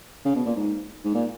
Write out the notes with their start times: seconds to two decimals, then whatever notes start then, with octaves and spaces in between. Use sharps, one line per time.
0.25 C#3
0.35 B2
0.45 A#2
0.56 G#2
1.05 G#2
1.14 A#2